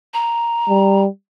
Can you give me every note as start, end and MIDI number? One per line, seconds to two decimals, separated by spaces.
0.14 1.01 82
0.69 1.07 55